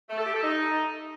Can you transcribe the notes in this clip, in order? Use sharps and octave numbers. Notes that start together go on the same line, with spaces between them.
A3
A4
G4
A4
D#4